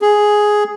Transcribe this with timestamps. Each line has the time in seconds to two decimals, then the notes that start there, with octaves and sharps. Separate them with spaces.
0.02 G#4